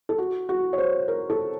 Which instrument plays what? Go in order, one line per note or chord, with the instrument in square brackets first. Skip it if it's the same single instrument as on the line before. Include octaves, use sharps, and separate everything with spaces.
[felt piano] A4
F#4
F#4
C#5
C5
A#4
A4